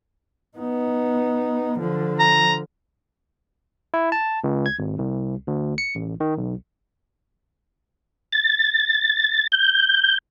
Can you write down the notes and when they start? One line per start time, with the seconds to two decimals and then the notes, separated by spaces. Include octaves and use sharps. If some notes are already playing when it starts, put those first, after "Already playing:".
0.57 B3 D#4
1.79 D3 F3
2.20 A#5
3.94 E4
4.12 A5
4.44 C#2
4.66 G#6
4.79 G#1
4.98 C2
5.47 D2
5.78 C#7
5.95 A1
6.20 D#3
6.38 B1
8.32 A6
9.52 G6